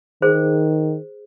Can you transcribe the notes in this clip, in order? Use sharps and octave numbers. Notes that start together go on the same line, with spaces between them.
D#3 G#4 C5